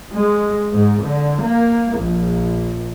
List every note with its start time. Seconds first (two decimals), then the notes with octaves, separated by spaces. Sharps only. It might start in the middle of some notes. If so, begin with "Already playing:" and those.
0.13 G#3
0.72 G#2
1.03 D3
1.40 A#3
1.97 A#1